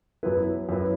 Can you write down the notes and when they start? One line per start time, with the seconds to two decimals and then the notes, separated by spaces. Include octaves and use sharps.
0.23 F#2 F#3 B3 E4 B4
0.69 F#2 F#3 B3 E4 B4